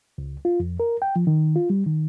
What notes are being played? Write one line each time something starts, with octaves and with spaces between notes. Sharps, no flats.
C#2
F4
F2
A#4
G5
F3
D#3
F4
G3
D#3